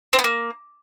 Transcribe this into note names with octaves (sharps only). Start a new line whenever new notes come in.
C4
B3
A#3